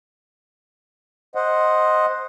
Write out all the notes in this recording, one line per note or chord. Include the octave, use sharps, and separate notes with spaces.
C5 D#5 F#5